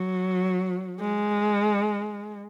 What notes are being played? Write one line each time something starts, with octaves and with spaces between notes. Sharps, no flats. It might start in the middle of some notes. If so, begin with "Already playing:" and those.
Already playing: F#3
G#3